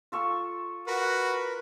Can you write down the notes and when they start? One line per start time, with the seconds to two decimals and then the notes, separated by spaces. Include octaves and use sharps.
0.12 F4 A4 C#6
0.87 F#4 A#4 B4 B5